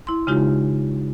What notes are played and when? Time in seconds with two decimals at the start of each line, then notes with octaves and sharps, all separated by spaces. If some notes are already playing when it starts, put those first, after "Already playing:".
0.07 E4 C6
0.27 C#3 G#3 D#4 F4 G4